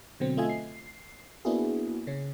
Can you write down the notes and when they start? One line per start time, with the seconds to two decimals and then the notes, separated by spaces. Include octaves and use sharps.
0.20 B2 D3 F#3 C4
0.37 A3 F4 D#5 E5 G#5
0.49 C7
1.45 A#3 B3 D4 E4 F#4 G#4
2.07 C#3 C#4